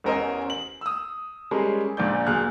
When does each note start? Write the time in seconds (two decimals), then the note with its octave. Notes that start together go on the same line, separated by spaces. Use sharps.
0.04 A1 E2 C#4 A#4 C5 D#5
0.50 F#7
0.81 D#6 E6
1.51 G3 G#3 C#4 G#4 A#4
1.97 A#1 A#2 D5 G6
2.27 D1 A#2 G#4 F6 F#6